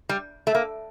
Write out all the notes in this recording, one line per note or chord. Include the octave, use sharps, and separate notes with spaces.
G3
A3
A#3